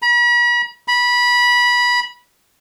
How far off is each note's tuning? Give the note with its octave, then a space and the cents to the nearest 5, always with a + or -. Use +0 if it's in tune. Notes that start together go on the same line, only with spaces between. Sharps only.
B5 -45
B5 -20